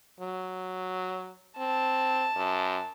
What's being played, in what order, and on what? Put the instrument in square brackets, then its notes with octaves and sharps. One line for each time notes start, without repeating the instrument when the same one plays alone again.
[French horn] F#3
[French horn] C4 [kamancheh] A5
[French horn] F#2